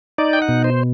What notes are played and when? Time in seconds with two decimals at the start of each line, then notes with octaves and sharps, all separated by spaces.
0.18 D#4 D5
0.33 G5
0.42 F#5
0.48 B2
0.64 C5